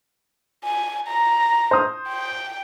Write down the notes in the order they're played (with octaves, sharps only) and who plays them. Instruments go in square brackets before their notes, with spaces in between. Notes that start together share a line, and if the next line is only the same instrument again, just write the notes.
[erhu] G#5
A#5
[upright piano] C5 D#6
[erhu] G5